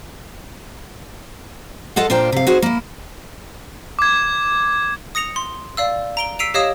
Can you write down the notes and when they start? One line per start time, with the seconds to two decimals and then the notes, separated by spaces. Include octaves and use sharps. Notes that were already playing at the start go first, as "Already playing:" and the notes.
1.96 F4 A4 D#5 F#5
2.10 A#2 D4 F4 C5 G5 A#5
2.32 C3 F5
2.47 D#4 F#4 G#4 C5
2.62 A#3 E4
3.99 D6 G#6
5.15 D#6 A#6 C#7 F7
5.36 C6
5.77 D5 F5 E6
6.17 A#5 D7 G7
6.39 E6 B6 C7 D7 D#7 F7
6.54 G4 C#5 D#5 F5 D#6 E7